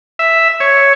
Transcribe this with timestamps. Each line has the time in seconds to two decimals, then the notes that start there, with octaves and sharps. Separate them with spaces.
0.19 E5
0.60 C#5